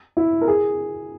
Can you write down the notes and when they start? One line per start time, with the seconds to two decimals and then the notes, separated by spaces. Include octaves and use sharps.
0.17 E4
0.41 A#4
0.48 G#4